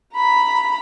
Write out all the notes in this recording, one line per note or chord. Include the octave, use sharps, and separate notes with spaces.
A#5 B5